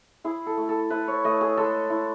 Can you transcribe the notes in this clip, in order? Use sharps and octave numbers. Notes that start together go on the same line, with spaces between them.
E4 G#4
A4
A3
A4
E4 B4
C#5
A3 D#5
G#4
G#3 A4
E4